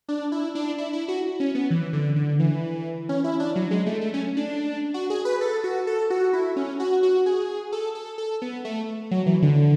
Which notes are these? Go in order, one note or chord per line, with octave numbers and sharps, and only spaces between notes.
D4
E4
D4
E4
E4
F#4
C#4
B3
E3
D3
D3
E3
C#4
E4
D4
F#3
G#3
A3
A3
C#4
D4
F#4
G#4
B4
A4
F#4
A4
F#4
E4
C#4
F#4
F#4
G#4
A4
A4
A4
B3
A3
F#3
E3
D3